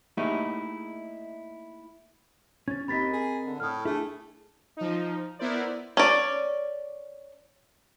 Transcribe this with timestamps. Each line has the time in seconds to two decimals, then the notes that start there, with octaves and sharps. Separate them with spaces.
0.17 A3 A#3 D#4 E4 G4 G#4
2.68 C#4 G#6 A6
2.88 D#2 C4 A#4 D#5 B5 A6 B6
3.13 G#4
3.46 D3
3.60 A2 D#6 F6
3.85 A3 D4 E4 G#4 G#5
4.77 F3 D#4
5.39 B3 E4 A#4 C5 D5
5.97 C#4 D5